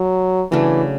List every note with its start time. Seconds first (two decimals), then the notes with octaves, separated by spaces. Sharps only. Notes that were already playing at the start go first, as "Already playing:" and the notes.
Already playing: F#3
0.51 C#3 E3 F#3 A3 D4